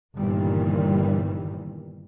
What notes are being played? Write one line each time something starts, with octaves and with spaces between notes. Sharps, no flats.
G1 G2 A#2 D#3 E3 G3